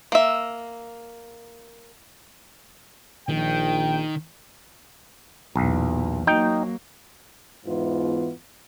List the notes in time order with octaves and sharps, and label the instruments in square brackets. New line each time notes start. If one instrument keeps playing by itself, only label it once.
[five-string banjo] A#3 E5
[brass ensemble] A#1 G5 [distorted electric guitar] D#3
[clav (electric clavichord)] B1 [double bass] E2 A#2
[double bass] F#3 A#3 [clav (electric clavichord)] D#4 G5
[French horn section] E2 G#2 E3 B3 E4 F4